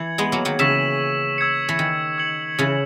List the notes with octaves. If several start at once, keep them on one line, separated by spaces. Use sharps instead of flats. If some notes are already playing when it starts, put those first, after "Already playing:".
Already playing: E3 G#6 C#7 F#7
G#3 B3
F#3 A#3
D#3 F#3
C#3 E3 C#6 E6 B6 E7
E6 G#6 C#7
E3
D#3
E6 G#6 C#7 F#7
C#3 E3